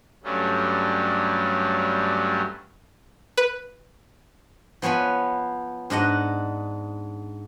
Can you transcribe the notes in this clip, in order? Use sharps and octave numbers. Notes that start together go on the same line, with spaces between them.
G2 F#3 G3 A3 C#4
B4
F3 B3 C#5 G#5 B5
G#2 D4 D#5 F#5